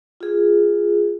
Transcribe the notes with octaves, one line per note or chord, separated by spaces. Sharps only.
F4 G#4